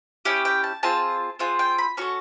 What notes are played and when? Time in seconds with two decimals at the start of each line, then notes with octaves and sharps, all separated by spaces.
0.25 C#4 E4 G4 G5
0.45 G5
0.64 A5
0.83 C4 F4 G#4 A5
1.39 C4 F4 G#4 F#5
1.59 G5
1.78 B5
1.97 C#4 F#4 A4 C#6